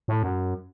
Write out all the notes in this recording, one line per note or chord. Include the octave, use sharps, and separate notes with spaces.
A2
F#2